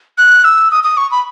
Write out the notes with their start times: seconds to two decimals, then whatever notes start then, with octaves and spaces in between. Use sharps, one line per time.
0.18 F#6
0.44 E6
0.71 D#6
0.84 D#6
0.97 C#6
1.11 B5